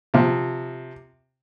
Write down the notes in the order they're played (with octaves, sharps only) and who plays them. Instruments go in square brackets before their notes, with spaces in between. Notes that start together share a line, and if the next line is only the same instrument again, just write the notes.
[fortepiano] C3 F3